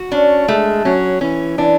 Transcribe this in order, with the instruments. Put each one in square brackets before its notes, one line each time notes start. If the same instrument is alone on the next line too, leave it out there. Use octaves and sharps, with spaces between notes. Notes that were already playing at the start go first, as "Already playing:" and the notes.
Already playing: [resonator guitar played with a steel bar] F#4
[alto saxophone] C#4 [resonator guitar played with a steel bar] D4
[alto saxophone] G#3 [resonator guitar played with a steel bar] A3
[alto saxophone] F#3 [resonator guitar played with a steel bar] C#4
[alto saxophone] E3 [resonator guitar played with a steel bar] C#4
[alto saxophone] E3 [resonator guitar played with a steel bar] D4